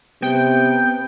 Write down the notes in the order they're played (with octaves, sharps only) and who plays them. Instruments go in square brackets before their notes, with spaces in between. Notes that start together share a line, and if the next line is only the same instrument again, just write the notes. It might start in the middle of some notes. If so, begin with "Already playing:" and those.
[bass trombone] C3 [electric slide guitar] B3 [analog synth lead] G5